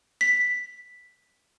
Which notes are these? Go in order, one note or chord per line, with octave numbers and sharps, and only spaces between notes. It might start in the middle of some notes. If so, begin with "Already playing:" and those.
B6